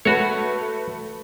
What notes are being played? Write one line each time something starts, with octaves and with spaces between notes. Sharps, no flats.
A3 F#4 B4 C#5